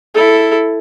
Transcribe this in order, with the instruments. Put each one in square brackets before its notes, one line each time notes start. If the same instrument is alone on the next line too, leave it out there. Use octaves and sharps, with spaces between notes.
[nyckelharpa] E4 A4